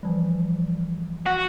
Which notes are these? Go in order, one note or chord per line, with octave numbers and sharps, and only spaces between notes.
E3 F3 G3
F#4